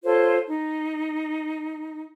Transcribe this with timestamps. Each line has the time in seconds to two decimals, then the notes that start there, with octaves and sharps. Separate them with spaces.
0.05 F4 A4 C5 C#5
0.47 D#4